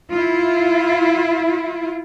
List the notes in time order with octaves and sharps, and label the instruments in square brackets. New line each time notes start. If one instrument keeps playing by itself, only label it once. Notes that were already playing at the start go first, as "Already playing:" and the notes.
[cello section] E4 F4